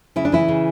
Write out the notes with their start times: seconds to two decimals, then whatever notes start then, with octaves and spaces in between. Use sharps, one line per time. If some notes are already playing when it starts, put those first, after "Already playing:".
0.16 C#3 E4
0.25 D4
0.32 E3 E4
0.48 C#3